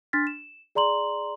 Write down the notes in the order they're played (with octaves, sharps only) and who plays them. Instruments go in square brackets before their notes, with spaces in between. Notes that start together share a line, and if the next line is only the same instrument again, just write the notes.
[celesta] D4 C6 F6 A6 B6
E7
G#4 D5 A#5 C6 F#7